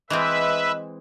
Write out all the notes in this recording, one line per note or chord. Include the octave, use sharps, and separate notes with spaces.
E3 G#3 C4 B4 D#5 E5